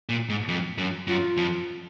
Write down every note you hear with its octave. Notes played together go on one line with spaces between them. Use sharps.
A#2
G#2
F2
F#2
F#2 F4
F2